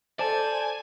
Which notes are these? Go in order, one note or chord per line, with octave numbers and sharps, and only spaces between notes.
A4 C5 D5 G#5 A5